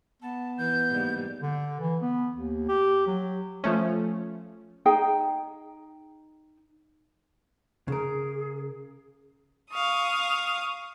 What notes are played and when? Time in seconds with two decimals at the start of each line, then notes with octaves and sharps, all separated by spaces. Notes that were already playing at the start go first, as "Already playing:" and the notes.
0.22 B3 A5
0.58 E3 B4 G6
0.89 G#2 G3 A#3
1.42 D3
1.80 E3
2.01 B3
2.35 D#2
2.68 G4
3.07 F#3
3.64 F3 A3 C#4
4.86 D#4 G#4 G5
7.88 C#3 G#4 A#4
9.70 F5 C#6 D#6